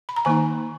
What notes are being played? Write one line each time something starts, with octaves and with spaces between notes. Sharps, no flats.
B5
A#5
D#3 A#3 D#4 G#5